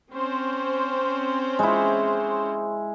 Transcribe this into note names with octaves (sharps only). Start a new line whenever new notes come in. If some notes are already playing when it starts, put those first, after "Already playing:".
C4 C#4 C5
G#3 E4